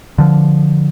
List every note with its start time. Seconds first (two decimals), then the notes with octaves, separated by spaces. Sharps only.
0.18 D3 F3